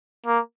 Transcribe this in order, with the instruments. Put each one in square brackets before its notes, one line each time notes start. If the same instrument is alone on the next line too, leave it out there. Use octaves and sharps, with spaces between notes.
[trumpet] A#3